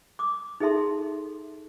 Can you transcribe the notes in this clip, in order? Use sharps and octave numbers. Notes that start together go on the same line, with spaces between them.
D6 D#6
D#4 G#4 A4 E5 A5 C6